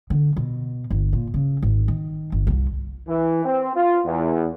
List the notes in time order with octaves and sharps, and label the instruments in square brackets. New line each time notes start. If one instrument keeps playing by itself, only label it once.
[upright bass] D3
B2
G1
A#2
C#3
G#1
D#3
G1
C2
[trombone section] E3
C4
F4
E2